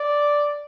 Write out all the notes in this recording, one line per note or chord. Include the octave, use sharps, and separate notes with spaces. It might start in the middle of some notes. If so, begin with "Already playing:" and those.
Already playing: D5